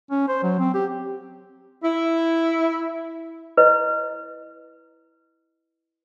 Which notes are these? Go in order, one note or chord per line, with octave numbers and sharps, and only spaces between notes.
C#4
C5
F#3
C4
G4
E4
E4 B4 D#5